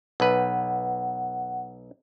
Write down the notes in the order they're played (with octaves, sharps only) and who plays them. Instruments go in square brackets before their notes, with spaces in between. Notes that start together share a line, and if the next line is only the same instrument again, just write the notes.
[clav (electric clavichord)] B1 B4 [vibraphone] F#5